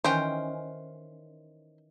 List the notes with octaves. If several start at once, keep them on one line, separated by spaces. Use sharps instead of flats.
D#3 E3 C#4 C5 G5